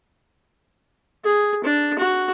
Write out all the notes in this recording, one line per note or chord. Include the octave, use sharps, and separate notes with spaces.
G#4
D4
F#4